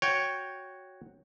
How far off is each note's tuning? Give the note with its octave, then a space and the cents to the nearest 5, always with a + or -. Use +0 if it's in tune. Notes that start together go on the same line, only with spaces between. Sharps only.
F#4 +0 C#5 +0 G5 +10